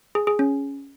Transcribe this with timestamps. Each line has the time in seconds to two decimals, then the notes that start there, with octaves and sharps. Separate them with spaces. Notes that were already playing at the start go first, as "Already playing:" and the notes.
0.15 G#4
0.27 G#4
0.39 C#4